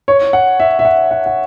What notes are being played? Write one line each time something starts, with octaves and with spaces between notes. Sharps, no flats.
C#5
F#5
E5
E5
F#5
F#5
F#5